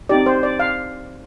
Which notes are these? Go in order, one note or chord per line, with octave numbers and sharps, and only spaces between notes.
C4 D#4 G4 D5
C5
D5
F5